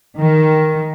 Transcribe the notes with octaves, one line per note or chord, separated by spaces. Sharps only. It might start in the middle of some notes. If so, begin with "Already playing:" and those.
D#3